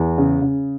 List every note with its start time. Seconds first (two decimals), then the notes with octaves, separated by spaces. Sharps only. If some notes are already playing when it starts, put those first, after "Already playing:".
Already playing: E2
0.18 C#3
0.42 C#3